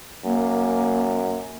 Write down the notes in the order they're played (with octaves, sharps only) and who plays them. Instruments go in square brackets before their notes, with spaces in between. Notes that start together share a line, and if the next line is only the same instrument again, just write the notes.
[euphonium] F#2 [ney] A#3